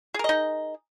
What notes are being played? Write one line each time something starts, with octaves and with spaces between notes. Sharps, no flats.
D#4 G#4 A#4 D#5